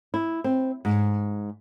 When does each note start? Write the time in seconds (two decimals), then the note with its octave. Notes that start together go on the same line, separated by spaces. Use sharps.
0.14 E4
0.44 C4
0.85 G#2